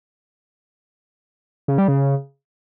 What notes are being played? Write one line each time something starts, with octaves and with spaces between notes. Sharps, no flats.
C#3
G3
C#3